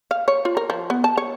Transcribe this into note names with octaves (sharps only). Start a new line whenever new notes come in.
F5
C#5
F4
A#4
F3
B3
A5
C#5